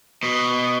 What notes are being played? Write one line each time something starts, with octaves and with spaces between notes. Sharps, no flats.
B2